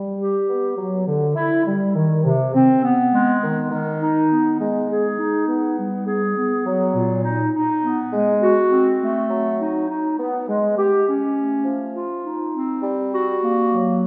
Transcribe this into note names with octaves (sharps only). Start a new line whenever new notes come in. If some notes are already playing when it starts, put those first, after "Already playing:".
Already playing: G3
G4
B3
F#3
D3
E4
G3
D#3
C3
C4
B3
G#3
D#3
D#3
D#4
B3
G#3
G#4
D#4
B3
G3
G#4
B3
F#3
A#2
D#4
D#4
B3
G#3
F#4
C4
A3
F#3
D#4
D#4
B3
G#3
G4
C#4
A3
F3
F4
D#4
C4
G3
F#4
A#3
F#3